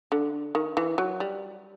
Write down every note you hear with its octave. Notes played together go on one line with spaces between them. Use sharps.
D3
D#3
E3
F#3
G3